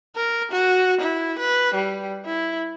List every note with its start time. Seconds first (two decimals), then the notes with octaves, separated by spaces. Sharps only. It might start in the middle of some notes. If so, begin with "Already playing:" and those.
0.16 A#4
0.51 F#4
1.01 E4
1.39 B4
1.74 G3
2.25 E4